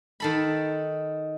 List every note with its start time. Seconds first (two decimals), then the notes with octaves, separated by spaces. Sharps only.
0.20 D#3 A4 B5